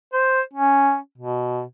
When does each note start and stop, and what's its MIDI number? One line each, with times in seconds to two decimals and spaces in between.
0.13 0.41 72
0.53 0.96 61
1.18 1.62 47